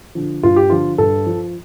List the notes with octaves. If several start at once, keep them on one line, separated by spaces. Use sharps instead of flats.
D3 F3
G2 F4
G4
D3 F3 F4
G2 A4
F3